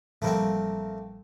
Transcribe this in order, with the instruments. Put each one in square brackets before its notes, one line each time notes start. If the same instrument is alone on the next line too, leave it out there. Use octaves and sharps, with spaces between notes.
[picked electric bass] A1 F3 G3 [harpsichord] A3 A#3 C4